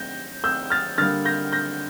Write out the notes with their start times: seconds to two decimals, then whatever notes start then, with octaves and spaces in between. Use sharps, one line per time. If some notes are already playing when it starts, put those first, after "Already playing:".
Already playing: G6 A#6
0.44 E6 G6
0.70 F6 A6
0.98 D3 G3 A#3 F6 A6
1.25 G6 A#6
1.53 G6 A#6